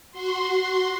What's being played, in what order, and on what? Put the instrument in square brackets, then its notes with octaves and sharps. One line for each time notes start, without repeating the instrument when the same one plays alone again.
[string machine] F#4 C6